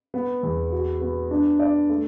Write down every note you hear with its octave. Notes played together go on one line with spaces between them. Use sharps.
B3
E2
F#4
B3
D4
D5
A3